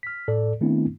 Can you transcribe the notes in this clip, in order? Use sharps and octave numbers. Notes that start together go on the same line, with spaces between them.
F6 B6
A2 A4 D5
D#3 A3 B3 C4 D4 E4